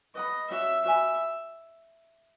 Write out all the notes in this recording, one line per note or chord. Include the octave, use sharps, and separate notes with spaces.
B4 D#5 F#5 B5
C#4 F#4 C#5 E5 F#5
F#4 C#5 E5 G#5 B5